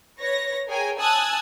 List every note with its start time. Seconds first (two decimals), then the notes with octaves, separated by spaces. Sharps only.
0.20 B4 C#5 A#6
0.68 G#4 A#4 C#5 G5 G#5
1.00 G#5 A5 D#6 E6 F#6 G#6